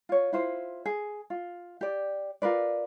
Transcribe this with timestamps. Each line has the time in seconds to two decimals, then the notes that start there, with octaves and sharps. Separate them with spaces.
0.09 F4 C#5
0.32 E4 F4 C5
0.86 G#4
1.30 F4
1.81 G4 D5
2.42 F4 A#4 B4 D5